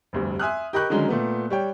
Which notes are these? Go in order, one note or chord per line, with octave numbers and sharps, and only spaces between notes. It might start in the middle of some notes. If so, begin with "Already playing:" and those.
F1 D2 G2
E5 G#5 C6 D#6 F6 F#6
G4 A#4 D#5 B5 C#6 F#6
D3 D#3 F#3 G#3 C#4
A#2 A3 B3
G3 C#5 G5